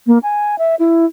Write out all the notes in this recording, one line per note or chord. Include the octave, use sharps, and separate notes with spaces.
A#3
G#5
E5
E4